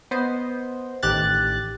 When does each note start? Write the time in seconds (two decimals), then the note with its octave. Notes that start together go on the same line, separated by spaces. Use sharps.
0.11 B3 C5 D#5
1.03 A1 D#3 G4 F#6 A6